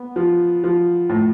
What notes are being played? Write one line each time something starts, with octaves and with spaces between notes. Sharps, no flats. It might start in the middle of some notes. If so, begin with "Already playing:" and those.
Already playing: B3
F3
F3
A2